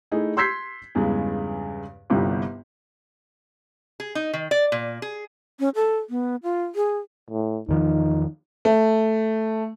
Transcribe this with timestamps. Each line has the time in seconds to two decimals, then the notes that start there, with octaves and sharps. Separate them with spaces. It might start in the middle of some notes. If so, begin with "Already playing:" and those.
0.12 A3 D#4 E4 G#4
0.37 C6 E6 G6 G#6 B6 C7
0.95 E2 G2 C#3 G#3
2.10 G1 C2 G2 G3
4.00 G#4
4.15 D#4
4.33 D#3
4.51 D5
4.72 A#2
5.02 G#4
5.60 C#4
5.75 A4
6.10 B3
6.43 F4
6.75 G#4
7.31 A2
7.69 E2 D#3 F3 D#4
8.65 A3